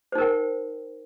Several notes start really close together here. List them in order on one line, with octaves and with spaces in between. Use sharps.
C5 D#4 A#4 G5